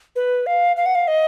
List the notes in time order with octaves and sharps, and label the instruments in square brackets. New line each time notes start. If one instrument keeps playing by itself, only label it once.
[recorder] B4
F5
F5
F#5
F5
D#5